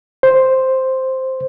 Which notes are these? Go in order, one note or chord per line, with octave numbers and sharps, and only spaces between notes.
C5